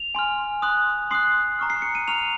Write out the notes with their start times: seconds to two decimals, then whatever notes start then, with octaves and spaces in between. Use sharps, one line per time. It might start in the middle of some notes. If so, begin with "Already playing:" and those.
Already playing: F7
0.15 G#5 C6 F6
0.62 C6 D#6 F#6
1.11 C6 D#6 F#6 C7
1.59 A#5 C#6 F6
1.70 C7
1.82 C#7
1.95 D#7
2.08 A#5 C#6 F6 F7